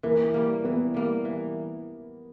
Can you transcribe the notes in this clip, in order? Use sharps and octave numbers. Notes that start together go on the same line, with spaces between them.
E3 A#3
G3 A#3
E3 B3
G3 A#3
E3